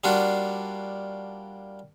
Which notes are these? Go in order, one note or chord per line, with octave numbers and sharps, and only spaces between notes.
G3 A#3 D4 F4 F#4